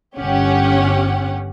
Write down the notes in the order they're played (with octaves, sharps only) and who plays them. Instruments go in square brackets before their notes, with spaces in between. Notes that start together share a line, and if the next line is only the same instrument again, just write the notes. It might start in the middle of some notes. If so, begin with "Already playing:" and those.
[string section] G1 C#4 G4 F#5